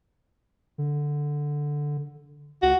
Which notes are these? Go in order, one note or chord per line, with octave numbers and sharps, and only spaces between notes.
D3
C#2 F#4